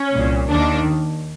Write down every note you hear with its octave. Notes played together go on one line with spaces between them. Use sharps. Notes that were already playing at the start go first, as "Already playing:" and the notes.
Already playing: C#4
C2 A#2
D#2 D#3 D4